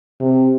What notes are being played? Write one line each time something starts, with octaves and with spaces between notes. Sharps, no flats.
C3